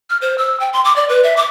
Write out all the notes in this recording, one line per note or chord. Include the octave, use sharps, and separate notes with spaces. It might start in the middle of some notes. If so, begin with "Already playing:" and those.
F6
C5
E6
G5
C6
D6
D5
B4
E5
D6